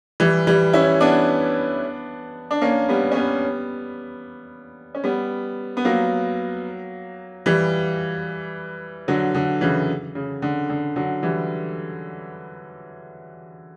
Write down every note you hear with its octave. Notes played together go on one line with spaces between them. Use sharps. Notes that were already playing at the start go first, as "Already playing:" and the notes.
E3 G3
E3 G3
C#4 E4
B3 D4
D4
A#3 C#4
G3 B3
C#4
G3 B3
C#4
G3 B3
B3
F#3 A#3
E3 G3
D3 F#3
D3
C#3 E3
C#3
D3
D3
D3 F#3
E3 G3